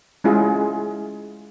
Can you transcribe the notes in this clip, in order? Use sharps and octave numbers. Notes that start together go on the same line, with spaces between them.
G#3 C#4 E4 F4 G#4